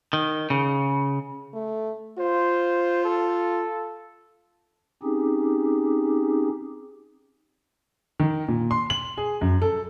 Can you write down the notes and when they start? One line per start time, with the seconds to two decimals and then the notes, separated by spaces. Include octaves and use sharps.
0.13 D#3
0.50 C#3
1.53 A3
2.18 F4 C5
3.05 A4
5.03 C4 C#4 D#4 G4 G#4
8.20 D#3
8.48 A#2
8.71 C6
8.90 F#7
9.17 G#4
9.41 F#2
9.62 A4